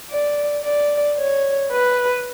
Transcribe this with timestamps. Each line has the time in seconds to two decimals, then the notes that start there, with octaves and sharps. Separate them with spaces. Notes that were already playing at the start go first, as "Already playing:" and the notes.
0.11 D5
0.64 D5
1.18 C#5
1.72 B4